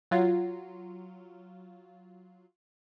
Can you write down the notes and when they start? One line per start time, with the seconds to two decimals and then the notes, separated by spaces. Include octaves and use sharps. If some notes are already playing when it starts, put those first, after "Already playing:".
0.11 F#3 F4